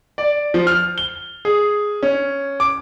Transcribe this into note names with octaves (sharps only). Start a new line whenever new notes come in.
D5
F3
F6
G7
G#4
C#4
D6